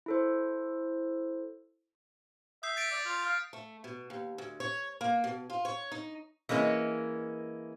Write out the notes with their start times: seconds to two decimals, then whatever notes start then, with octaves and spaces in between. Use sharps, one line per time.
0.06 E4 A4 C5
2.63 E5 D#6 G6 C7
2.77 A6 B6 D7
2.91 D5
3.05 F4
3.25 F5
3.53 A3
3.84 B2
4.10 D#2
4.38 D2
4.60 C#5
5.01 A#3
5.24 B2
5.50 F4
5.65 C#5
5.92 D#4
6.49 E3 G#3 A#3 C#4